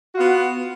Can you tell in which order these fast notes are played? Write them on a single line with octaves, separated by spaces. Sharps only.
F#4 F4 B3